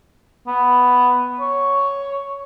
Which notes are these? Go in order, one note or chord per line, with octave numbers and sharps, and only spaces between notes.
B3
C#5